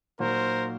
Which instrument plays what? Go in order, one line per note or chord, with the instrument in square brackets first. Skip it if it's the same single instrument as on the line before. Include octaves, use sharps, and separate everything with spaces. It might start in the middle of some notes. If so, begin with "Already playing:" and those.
[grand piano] A#2 F#3 A#3 D#4 [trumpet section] A#4 C5